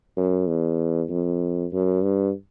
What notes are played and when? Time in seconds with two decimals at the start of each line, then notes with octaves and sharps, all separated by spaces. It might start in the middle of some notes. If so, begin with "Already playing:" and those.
0.17 F#2
0.47 E2
1.10 F2
1.73 F#2
2.03 G2